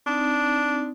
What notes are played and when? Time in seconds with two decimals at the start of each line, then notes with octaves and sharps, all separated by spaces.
0.06 C4 D4 D#4